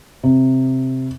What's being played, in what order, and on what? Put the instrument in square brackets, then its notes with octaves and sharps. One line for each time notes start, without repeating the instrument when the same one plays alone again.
[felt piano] C3